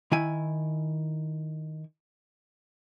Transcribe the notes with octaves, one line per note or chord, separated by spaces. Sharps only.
D#3 E4 G#5